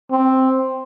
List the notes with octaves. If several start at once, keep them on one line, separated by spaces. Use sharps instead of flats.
C4